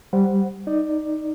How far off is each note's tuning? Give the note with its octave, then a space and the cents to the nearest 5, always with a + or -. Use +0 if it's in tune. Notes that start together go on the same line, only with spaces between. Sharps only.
G3 +0 C5 +0 F#5 +0
D#4 +0 D5 +10